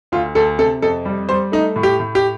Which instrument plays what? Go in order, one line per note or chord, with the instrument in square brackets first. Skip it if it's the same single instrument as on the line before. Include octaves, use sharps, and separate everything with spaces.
[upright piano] D2 F4
D2 A4
C3 A4
F2 A4
G3
G3 C5
A3 D#4
A2
G4
A2
G4